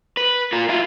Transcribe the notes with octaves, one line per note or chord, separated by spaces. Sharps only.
B4
F4 A#4
E4 F4